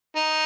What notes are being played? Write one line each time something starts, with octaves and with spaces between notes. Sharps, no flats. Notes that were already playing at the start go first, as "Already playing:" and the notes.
D#4